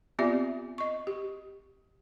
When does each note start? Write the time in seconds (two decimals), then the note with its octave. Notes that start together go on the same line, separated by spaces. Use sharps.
0.19 B3 C4 F4 G4 D5 E5
0.78 D#5 C#6
1.07 G4